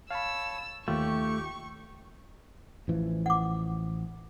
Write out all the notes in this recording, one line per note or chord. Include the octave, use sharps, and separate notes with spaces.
C#5 F5 A5 B5 E6
D#2 A3 F4 G4 C#6
A1 E3 F3
F#5 D6